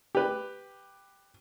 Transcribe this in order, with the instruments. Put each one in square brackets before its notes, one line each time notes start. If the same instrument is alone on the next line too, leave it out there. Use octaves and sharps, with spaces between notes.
[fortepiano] G4 B4